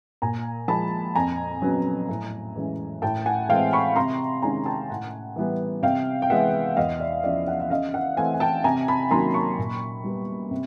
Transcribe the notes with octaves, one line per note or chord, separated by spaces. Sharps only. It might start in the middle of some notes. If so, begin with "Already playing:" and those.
A#2 G#5 A#5
F3 G#3 A5 B5
F2 G#5 A#5
C#3 F#3 B3
A2
E3 G#3 C#4
A2 G5 A5
F#5 G#5
E3 G#3 C4 F5 G5
B5 C#6
C3 A#5 C6
D#3 G#3 C#4 G#5 A#5
G5 A5
A2 F#5 G#5
E3 G3 B3
C3 F5 G5
G5
E3 G#3 B3 E5 F#5
E2 D#5 F5
D5 E5
C#3 F3 D5 E5
E5 F#5
E5
C#3 D#5 F5
E5 F#5
E3 A3 C4 F#5 G#5
G#5
G5 A5
C3 G#5 A#5
A5 B5
D#3 F#3 A#3 C#4 A#5 C6
B5 C#6
A#2
G3 B3
C3